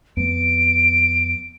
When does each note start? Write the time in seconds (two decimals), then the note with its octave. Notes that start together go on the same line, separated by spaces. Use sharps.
0.17 F2 B3 D7